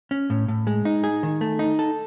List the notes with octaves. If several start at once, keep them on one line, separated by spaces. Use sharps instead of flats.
C#4
A2
A2
G#3
D#4
G#4
D#3
A3
D#4
A4